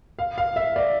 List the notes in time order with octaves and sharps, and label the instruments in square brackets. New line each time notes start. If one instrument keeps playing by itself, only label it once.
[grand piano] F5
F5
E5
D5